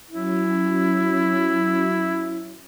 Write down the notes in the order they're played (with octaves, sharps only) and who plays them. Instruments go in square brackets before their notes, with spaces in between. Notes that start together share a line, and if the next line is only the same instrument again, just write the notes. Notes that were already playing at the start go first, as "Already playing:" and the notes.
[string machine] F#3 C#4 [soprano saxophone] E4